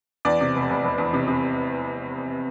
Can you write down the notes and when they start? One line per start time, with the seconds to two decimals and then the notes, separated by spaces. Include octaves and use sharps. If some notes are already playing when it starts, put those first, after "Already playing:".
0.25 E2 D5
0.41 C3
0.55 F1
0.69 F1
0.84 F1
0.98 E2
1.13 C3
1.28 C3